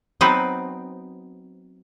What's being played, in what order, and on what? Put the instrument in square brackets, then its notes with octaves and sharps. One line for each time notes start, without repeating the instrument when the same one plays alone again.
[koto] F#3 B3 C4 D#4 B4